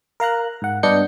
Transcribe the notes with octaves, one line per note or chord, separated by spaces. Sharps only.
A#4 F5 A#5 F#6
G#2 F#5
G2 B3 D4 D#5 G6 C#7